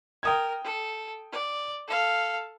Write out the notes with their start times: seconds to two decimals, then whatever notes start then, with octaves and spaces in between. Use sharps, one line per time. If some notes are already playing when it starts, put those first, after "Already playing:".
0.23 A#4 G5 D#6 G#6
0.64 A4
1.32 D5
1.88 A4 F5